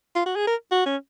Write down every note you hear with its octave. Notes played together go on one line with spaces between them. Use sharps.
F4
F#4
G#4
A#4
F#4
C#4